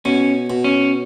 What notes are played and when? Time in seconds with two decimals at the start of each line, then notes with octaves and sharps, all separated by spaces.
0.05 B2 C#4
0.50 B2
0.64 C#4